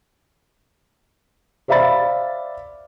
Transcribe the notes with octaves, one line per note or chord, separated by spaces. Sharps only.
C5 D5 E5 F5 B5 A6